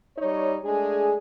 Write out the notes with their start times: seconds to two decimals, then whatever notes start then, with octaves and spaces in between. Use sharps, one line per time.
0.17 G3 D#4 C#5
0.64 G#3 A3 D4 G#4